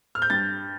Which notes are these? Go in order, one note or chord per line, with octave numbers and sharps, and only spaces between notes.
F6
G6
G2 A6